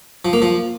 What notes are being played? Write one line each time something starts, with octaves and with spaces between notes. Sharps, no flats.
F3
A#3
F3